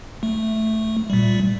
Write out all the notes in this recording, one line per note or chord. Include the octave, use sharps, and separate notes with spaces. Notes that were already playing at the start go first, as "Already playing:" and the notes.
A3
A#2 G3